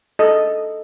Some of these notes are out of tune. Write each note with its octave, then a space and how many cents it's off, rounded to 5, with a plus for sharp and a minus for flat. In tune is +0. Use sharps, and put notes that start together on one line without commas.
A4 +0 D#5 +0